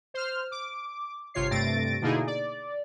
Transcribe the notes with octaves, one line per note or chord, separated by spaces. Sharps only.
C5 F6
D6
G1 C3 F4 C#5 C7
G2 C3 A3 A6 A#6 D7
B2 D3 A#3 D#4 E4 G#4
D5